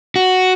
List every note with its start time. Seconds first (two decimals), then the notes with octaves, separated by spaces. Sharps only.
0.16 F#4